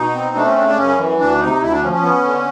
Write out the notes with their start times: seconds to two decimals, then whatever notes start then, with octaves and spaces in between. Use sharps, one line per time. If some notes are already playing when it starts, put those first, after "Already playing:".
Already playing: B2 D#4
0.14 C4
0.35 A3 D4
0.46 C#4
0.56 C#3 D4
0.67 D4
0.77 F#2 C#4
0.98 E3
1.19 D2 D4
1.40 C3 D#4
1.61 D2 E4
1.71 D4
1.82 F3 C#4
1.93 C#4
2.03 B3
2.24 D3